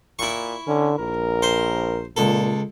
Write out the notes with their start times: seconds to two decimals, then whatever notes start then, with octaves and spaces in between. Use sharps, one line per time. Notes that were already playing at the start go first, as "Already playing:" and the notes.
0.19 A#2 E4 C#6
0.67 D3 C#4
0.99 A#1 A#4
1.42 C5
2.17 C#2 A#2 A4